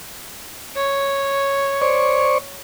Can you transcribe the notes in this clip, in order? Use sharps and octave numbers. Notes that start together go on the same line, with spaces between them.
C#5
C5 D5 C#6